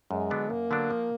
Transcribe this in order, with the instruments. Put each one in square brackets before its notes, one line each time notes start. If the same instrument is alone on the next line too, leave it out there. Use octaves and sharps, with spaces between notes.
[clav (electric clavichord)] F#2 [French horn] G#3
[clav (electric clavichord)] D3 F#3 B3 D4
[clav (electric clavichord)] F#2 [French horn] A#3
[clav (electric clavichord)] D3 F#3 B3 D4
F3